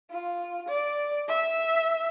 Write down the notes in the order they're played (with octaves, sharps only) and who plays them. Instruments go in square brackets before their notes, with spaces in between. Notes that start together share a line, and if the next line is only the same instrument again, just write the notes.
[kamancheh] F4
D5
E5